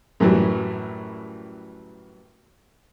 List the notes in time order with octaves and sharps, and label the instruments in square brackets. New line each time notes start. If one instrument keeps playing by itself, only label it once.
[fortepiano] F#2 A2 E3 F#3 G3